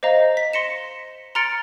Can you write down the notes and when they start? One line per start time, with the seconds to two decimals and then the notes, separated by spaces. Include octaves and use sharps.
0.03 C5 D#5 F5 A#5
0.37 B6
0.53 C6 A#6 C#7 E7
1.35 A#5 C6 F6 A6 C#7 D7